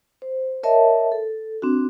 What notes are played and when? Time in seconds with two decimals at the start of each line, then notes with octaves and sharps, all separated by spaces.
0.22 C5
0.63 A#4 C#5 D#5 E5 A5
1.12 A4
1.62 C4 D4 F#4